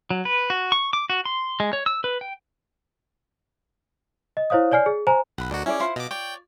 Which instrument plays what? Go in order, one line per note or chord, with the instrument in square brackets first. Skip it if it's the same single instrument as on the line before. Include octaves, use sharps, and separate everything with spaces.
[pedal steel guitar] F#3
B4
F#4
C#6
D6
F#4
C6
G#3
C#5
E6
B4
G5
[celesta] D#5
E4 C5 C#5 F5 D#6
C#5 D5 G#5 F6 C7
G#4
C5 G#5 A#5
[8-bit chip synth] B1 [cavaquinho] F#5 B5
[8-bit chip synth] D2 F#4 [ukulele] D4 A#4 [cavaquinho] D#5
[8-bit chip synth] C#4 [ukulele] E4 G#4 D5
[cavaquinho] E4 C5 [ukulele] F4
[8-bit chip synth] B2 D6 [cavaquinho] D#5
[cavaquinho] C#5 D5 [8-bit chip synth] G5